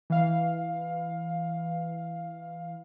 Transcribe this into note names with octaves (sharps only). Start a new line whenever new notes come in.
E3 F5